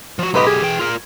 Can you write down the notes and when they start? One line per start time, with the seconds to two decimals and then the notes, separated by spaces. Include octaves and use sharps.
0.19 F3 F#4
0.34 B1 G#2 G4 B4 D#5
0.46 G#4
0.62 E3 G5
0.79 F4 A#4